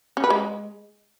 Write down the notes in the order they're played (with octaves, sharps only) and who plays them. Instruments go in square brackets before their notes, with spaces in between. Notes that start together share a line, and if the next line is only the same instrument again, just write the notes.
[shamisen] C#4
B4
G#3